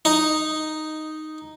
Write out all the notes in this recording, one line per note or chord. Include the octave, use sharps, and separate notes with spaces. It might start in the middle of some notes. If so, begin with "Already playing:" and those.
D#4